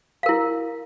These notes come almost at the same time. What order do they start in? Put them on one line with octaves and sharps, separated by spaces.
F5 A#4 E4